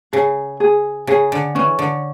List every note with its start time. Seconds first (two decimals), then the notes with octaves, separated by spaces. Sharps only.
0.13 C#3 G#4
0.60 G#4
1.07 C#3 G#4
1.32 D3
1.55 E3 C#4
1.79 D3